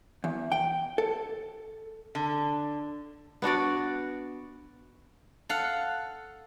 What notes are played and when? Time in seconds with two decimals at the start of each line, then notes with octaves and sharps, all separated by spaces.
0.24 E2
0.52 G5
0.98 A4
2.15 D3
3.42 B3 D4 F#4 D5
5.49 A4 F5 F#5